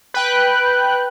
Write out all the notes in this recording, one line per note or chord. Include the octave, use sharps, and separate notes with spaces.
B4 G5 F#6